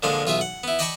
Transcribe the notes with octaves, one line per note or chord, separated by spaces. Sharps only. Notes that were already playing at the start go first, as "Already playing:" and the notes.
A#2 D3 F3 G#3 F5
B1 F4 G#4 E5
F#5
B3 E4
D5 D#5 G5 A5 B5 C#6